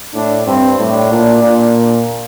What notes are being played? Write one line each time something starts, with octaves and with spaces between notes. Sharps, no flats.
A2 D4
G2 C4
A2 D4
A#2
A#2